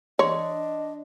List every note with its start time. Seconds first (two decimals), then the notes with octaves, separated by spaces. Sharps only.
0.19 D4 C#5 D#5 C6